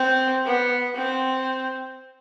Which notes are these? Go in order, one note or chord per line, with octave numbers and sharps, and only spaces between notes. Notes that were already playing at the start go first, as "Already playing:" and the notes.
Already playing: C4
B3
C4